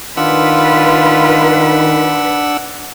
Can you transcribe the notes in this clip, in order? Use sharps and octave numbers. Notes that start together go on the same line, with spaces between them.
D#3 D4 F4 B4 F#5 E6